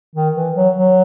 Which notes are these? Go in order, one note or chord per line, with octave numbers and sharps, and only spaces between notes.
D#3
E3
F#3
F#3